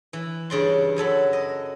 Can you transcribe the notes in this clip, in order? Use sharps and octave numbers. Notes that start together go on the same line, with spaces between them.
E3
G2 C#3 D5 C6
F#2 F#3 A4 B5
D#5